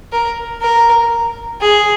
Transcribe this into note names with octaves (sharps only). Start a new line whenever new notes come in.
A#4
A#4
G#4